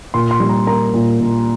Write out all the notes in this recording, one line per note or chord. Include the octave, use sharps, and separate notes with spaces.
A#2 C6
C6
G3
A#5
A#3 A#5
A#2
A#2